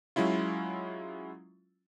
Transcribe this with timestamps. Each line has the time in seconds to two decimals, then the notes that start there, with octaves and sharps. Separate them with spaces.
0.16 F#3 G#3 C#4 E4 F4